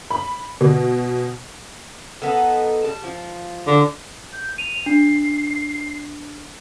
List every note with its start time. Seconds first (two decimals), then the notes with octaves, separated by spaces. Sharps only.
0.11 B5
0.61 B2
2.22 B3 D#4 A4
2.84 G3 A5
3.04 F3
3.67 D3
4.33 G6
4.58 D#7 F7
4.86 D4 C7